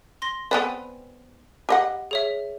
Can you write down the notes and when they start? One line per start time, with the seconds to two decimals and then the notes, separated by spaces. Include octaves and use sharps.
0.22 C6 A#6 G7
0.51 B3 C4 B4 D5 G#5
1.69 G4 D#5 F#5
2.11 G#4 C#5 E5